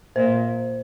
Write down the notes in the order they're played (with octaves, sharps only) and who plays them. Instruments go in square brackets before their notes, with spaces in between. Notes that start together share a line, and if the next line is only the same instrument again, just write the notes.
[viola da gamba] A#2 [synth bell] C5